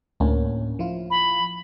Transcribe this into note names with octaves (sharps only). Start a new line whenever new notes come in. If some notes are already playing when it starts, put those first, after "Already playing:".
D2 A2 A#3 C#4
F3 E4 F4
B5